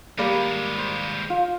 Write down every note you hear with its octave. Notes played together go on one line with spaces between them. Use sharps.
D#2 G3 G#3 A#3
C5
F4